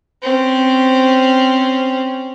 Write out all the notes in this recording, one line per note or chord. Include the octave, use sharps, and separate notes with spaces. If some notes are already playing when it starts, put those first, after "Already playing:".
C4 C#4